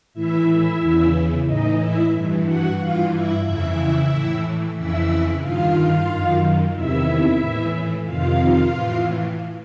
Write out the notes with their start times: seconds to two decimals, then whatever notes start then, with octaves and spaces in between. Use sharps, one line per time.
0.14 A2 E3 E4 E5
0.80 E2 C#3 E3
1.46 A2 E3 D#4 D#5
1.79 E4 E5
2.12 G2 E3
2.45 F#4 F#5
2.78 G2 E3 F4 F5
3.11 E4 E5
3.44 F2 C#3 E3 E4 E5
4.10 A2 E3
4.75 F2 C#3 E3 E4 E5
5.41 G2 D#3 F4 F5
6.08 F#2 D#3
6.74 E2 C3 D#3 E4 E5
7.40 A2 E3
8.05 F2 C3 D#3 F4 F5
8.72 A2 E3